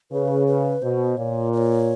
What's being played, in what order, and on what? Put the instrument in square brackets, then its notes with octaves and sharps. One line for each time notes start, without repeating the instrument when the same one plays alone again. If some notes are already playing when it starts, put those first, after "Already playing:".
[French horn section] C#3 [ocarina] B4
[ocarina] B4
[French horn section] B2 [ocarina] C5
[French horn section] A#2 [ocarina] C#5
[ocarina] D5
C#5